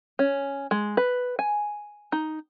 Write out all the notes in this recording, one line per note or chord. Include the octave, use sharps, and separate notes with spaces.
C#4
G#3
B4
G#5
D#4